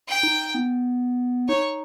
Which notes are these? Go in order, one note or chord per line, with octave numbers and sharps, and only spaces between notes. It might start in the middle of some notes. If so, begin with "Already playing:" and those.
G5
D#4
B3
D#4 C#5